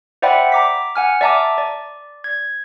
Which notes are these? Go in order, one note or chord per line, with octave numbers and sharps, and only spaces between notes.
C5 D5 E5 F#5 G5 B5
A#5 D6 B6
F#5 G#5 F6
D5 E5 A5 A#5 D6
D5
G#6